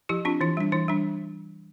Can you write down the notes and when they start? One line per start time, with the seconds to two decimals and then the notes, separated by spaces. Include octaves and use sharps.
0.09 F3 E4 G4
0.25 C4 D4 F4
0.41 E3 E4
0.57 G3 D4
0.72 E3 E4
0.88 G3 D4